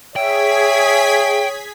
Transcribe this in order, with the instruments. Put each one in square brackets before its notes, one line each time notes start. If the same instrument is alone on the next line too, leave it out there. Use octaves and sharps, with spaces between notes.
[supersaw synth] G#4 G#6 B6 [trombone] C#5 [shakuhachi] E5 [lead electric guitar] G5